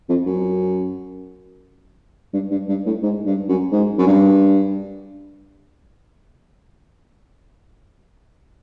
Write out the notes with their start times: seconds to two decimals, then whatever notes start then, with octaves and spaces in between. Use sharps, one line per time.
0.09 F2
0.26 F#2
2.33 G2
2.51 G2
2.69 G2
2.86 A2
3.02 G#2
3.26 G2
3.49 F#2
3.72 G#2
3.99 F#2
4.07 G2